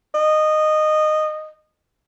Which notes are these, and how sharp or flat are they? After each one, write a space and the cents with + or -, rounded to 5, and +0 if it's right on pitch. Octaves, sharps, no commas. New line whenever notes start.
D#5 -15